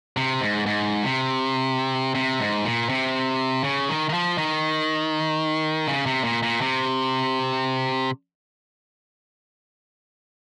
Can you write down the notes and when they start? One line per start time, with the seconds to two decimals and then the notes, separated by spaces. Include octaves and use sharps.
0.17 C3
0.41 G#2
0.66 G#2
1.04 C3
2.15 C3
2.40 G#2
2.65 A#2
2.89 C3
3.64 C#3
3.89 D#3
4.09 D#3
4.14 F3
4.38 D#3
5.87 C#3
6.06 C3
6.24 A#2
6.43 A#2
6.61 C3